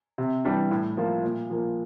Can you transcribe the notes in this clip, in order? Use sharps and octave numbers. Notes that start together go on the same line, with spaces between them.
C3
E3 G3 D4
A2
F3 A#3 F4
A#2
F3 A#3